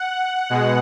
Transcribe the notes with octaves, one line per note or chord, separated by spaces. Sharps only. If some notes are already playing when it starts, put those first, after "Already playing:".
Already playing: F#5
B2 G#3